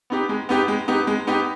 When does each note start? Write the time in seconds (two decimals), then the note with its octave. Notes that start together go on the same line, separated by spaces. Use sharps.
0.10 B3 D#4 G4
0.29 G#3
0.49 B3 D#4 G4
0.68 G#3
0.88 B3 D#4 G4
1.07 G#3
1.27 B3 D#4 G4